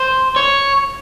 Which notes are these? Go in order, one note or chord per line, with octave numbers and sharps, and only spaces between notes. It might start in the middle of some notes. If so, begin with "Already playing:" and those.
Already playing: C5
C#5